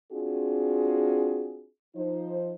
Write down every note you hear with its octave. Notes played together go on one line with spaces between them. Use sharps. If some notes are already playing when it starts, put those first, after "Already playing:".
C4 D4 F4 F#4 G#4
F3 D#4 C5